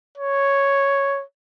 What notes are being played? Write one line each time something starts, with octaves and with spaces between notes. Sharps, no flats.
C#5